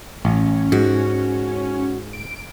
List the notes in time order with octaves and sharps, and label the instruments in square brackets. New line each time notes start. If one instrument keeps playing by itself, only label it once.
[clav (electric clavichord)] A1 [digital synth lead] C#4
[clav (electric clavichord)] G#2 [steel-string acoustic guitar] F#4
[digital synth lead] D7